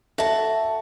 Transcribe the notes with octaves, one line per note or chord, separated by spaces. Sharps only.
F#4 A4 E5 A5